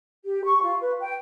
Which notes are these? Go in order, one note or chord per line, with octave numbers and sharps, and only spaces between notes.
G4
C#6
F4
B4
G5